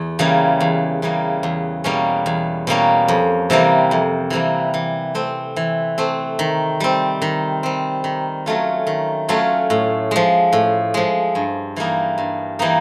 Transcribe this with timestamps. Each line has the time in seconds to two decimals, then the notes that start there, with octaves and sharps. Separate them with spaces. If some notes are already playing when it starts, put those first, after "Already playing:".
Already playing: E2
0.19 C#3 E3 G3 A#3
0.60 E2
1.02 C#3 E3 G3 A#3
1.43 E2
1.84 B2 G3 A#3 C#4
2.26 E2
2.67 B2 G3 A#3 C#4
3.08 F2
3.50 C3 E3 G3 A#3
3.91 F2
4.30 C3 E3 G3 A#3
4.74 E3
5.15 A3 C4
5.56 E3
5.98 A3 C4
6.39 D#3
6.80 G3 C4
7.22 D#3
7.63 G3 C4
8.04 D#3
8.46 F#3 A3 C#4 F4
8.87 D#3
9.29 F#3 A3 C#4 F4
9.70 A2
10.11 F3 G#3
10.53 A2
10.94 F3 G#3
11.35 G2
11.76 E3 G3 A#3 D#4
12.18 G2
12.59 E3 G3 A#3 D#4